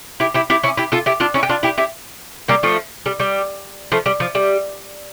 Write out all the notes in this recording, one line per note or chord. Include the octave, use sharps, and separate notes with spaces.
E4 G4
E4 G4
E4 G4
C#4 E4
E4 G4
F4 A4
E4 G4
D4 F4
C#4 E4
G4
D4 F4
E4 G4
E4 G4
G3 A#3
F3 A3
G3
G3
F3 A3
G3
F3
G3